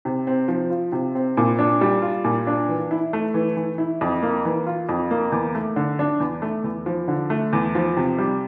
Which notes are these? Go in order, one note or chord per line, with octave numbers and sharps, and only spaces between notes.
C3
C4
F3
F4
C3
C4
A#2
D4
G3
F4
A#2
D4
E3
E4
A3
E3
E3
E4
F2
A#3
E3
F4
F2
A#3
E2
A3
D3
D4
E2
A3
E2
F3
D3
A3
E2
F3
C3
G3